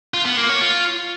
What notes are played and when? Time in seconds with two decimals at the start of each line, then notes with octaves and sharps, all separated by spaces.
0.14 F4
0.26 B3
0.37 A#3
0.49 C#5
0.61 F4